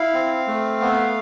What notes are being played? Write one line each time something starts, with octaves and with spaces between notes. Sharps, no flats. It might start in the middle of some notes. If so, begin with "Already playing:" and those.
Already playing: E4 F5
C4
A3
B3